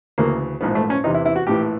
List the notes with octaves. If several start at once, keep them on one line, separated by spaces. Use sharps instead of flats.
D2 C#3 E3 A#3
A#1 G#2 E3 B3
A3
C#4
E2 C3 E3 D#4
E4
E4
F#4
A#1 A2 E3 G4